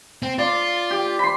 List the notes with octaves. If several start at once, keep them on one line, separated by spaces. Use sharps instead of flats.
C4
F4 D5
G4
B5 C6